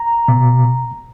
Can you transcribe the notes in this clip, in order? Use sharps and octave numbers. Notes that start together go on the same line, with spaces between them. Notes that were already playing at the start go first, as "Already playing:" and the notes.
Already playing: A#5
B2